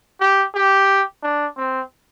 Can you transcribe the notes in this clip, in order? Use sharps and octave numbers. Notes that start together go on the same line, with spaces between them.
G4
G4
D4
C4